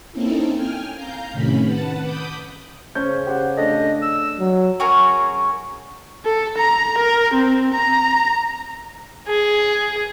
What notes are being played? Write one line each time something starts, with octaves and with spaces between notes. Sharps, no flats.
A#3 C4 C#4 D#4 E4 A4
G5 G#5 F6
F5 A#5 G6
A2 C3 D#3 C#4 B5
B4 F#5 A5
B5 D6 D#6 G6
C#3 C#4 C5 G6
G4 C5 F#5
A3 D4 A4 D#5
E6
F#3
C#4 F#4 G#4 A#4
A4
A#5
A#4
C4
A#5
G#4